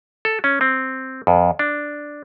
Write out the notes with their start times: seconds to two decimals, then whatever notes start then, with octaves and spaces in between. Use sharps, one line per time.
0.25 A4
0.44 C#4
0.61 C4
1.27 F2
1.59 D4